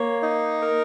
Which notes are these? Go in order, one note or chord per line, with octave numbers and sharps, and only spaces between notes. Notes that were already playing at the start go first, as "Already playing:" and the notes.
Already playing: A#3 C#5
D#4
A#4